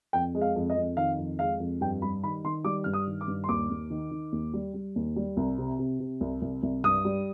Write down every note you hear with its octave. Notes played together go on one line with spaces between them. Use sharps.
F2 G5
G#3
F5
F2
D#5
F2
D#3 F5
F2
G#3 F5
F2
G2 G5
G3 B5
D#3 B5
D#3 C6
G3 D6
G2 F6
D#6
D#3
D6
G2
C6
D#2 D6
D#2
D#3
D#3
D#2
G3
G3
D#2
G3
C2
C3
C3
C3
C2
C2
C2
G2 D#6
G3